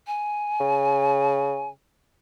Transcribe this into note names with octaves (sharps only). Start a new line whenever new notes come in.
G#5
C#3